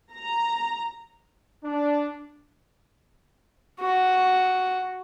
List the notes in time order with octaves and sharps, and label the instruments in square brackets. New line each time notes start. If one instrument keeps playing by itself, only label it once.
[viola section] A#5
[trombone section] D4
[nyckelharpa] F#4